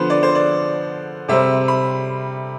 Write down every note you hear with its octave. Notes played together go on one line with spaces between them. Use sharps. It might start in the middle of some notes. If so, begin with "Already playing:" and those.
Already playing: D3 F3 B3 C5
D5
C5
D5
C3 G3 C4 E5
B5